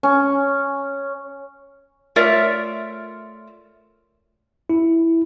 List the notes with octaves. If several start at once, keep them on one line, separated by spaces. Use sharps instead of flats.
C#4
A3 F4 A#4 C#5 D5 E5
E4